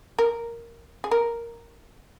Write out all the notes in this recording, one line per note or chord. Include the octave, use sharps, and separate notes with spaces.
A#4
G#4
A#4